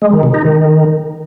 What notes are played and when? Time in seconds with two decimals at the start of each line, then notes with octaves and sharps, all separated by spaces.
0.02 G#3
0.12 D#3
0.23 C3
0.34 D#4
0.45 D#3